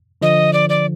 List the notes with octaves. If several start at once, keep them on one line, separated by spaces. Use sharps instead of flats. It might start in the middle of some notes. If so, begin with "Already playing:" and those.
D3 F3 D#5
D5
D5